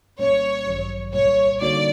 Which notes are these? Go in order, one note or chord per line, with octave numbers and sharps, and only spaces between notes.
C2 A#2 G3 A#3 C#4 C#5
A1 G2 D#3 F#3
C2 A#2 G3 C#5
D3 G3 A#3 D#4 F#4 D5